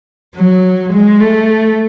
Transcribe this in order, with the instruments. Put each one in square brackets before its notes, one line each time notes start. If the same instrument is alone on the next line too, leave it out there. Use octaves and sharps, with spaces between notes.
[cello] F#3
G#3
A3